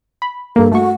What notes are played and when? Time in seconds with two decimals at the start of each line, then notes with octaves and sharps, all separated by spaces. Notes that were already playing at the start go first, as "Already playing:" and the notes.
0.22 B5
0.56 G2 A#3 A4
0.72 A3 F#4 C#6